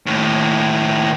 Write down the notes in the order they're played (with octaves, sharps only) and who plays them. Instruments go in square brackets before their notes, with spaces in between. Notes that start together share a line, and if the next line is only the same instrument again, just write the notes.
[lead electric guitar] D#2 A2